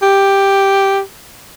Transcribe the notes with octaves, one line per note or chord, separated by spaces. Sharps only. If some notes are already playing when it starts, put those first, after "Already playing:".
G4